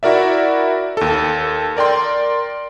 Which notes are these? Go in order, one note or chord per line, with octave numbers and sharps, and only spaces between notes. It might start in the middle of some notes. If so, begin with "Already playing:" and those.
E4 F#4 A#4 D5 E5
D#2 A4
A#4 D5 G5 C6